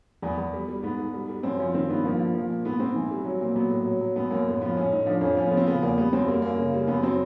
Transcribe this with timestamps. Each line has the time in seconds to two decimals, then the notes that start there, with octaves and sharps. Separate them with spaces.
0.22 E2 B3
0.38 E2
0.53 G3
0.68 G3
0.83 G#2 B3
0.99 G#2
1.14 G3
1.29 G3
1.43 F#2 C4
1.58 F3 C#4
1.74 D#3 C4
1.89 G2 B3
2.04 F3 A#3
2.19 F3
2.35 F3
2.49 A#2
2.65 G#2 B3
2.79 G#2 C4
2.96 E3
3.11 G3
3.25 F#3
3.41 A#2
3.55 F#3 B3
3.70 A2
3.86 F#3
4.01 F#3
4.16 F#2 B3
4.30 F#2 A#3
4.46 A2 B3
4.61 F3 B3
4.77 A2 C#4
4.92 A2 D#4
5.06 F3 D4
5.21 F2 C#4
5.37 F3 C#4
5.46 B3
5.51 F3
5.57 C4
5.67 C#3 B3
5.82 E2 A#3
5.97 G3 B3
6.13 F#2 C4
6.28 G3 A#3
6.42 F#2 A#3
6.58 C#3
6.73 G3
6.87 F#2 B3
7.02 F#3 C4